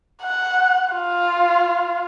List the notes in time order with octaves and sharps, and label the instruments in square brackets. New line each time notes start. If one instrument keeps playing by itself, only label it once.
[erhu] F#5
F4